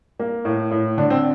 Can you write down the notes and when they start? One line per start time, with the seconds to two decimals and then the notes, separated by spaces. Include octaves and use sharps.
0.20 A#3
0.45 A2
0.71 A2
0.98 D3 D4
1.10 C4